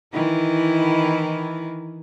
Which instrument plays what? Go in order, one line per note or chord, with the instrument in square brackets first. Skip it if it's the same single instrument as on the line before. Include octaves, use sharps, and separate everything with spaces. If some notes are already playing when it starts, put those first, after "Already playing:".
[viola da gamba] D#3 E3 E4